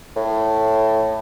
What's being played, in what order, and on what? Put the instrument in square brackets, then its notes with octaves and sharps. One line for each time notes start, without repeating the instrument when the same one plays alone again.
[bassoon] A2